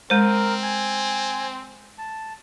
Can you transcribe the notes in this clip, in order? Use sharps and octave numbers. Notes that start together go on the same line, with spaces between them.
G#3 C4 A#4 C5
G#5
A5